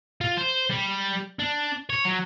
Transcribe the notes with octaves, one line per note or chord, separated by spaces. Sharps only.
F4
C5
G3
D4
C#5
F#3